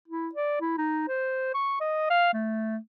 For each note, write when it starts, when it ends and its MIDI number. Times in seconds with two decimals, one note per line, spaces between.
0.08 0.29 64
0.35 0.60 74
0.60 0.74 64
0.78 1.05 63
1.08 1.52 72
1.54 1.78 85
1.80 2.07 75
2.10 2.32 77
2.33 2.77 57